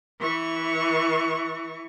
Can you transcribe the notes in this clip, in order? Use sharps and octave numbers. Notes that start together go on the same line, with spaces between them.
E3 C#6